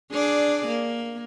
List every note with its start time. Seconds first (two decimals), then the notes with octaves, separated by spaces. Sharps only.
0.12 D4 G#4 D5
0.67 A#3